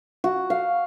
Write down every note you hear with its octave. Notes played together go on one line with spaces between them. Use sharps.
F#4
F5